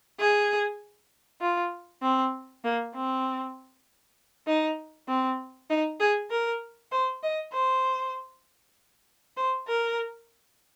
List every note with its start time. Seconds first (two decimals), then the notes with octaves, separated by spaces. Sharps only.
0.20 G#4
1.41 F4
2.02 C4
2.64 A#3
2.95 C4
4.47 D#4
5.08 C4
5.70 D#4
6.00 G#4
6.31 A#4
6.92 C5
7.23 D#5
7.53 C5
9.37 C5
9.68 A#4